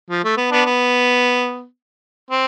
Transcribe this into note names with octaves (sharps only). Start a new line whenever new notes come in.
F3
A3
B3
B3 D4
B3
C4